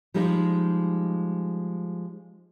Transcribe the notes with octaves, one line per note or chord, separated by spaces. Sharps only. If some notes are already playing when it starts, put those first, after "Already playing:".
F3 G3 G#3 D#4